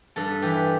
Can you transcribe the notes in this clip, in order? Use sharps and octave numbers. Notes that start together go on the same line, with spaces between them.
G2 A4
E3 G4